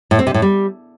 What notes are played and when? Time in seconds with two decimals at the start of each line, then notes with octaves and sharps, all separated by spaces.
0.11 A2
0.19 C4
0.27 C3
0.34 A2
0.42 G3